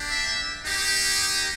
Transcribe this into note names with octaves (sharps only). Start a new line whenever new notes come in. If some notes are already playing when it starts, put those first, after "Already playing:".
Already playing: A#3 D4 G4
E5
A#3 D#4 G4
D#5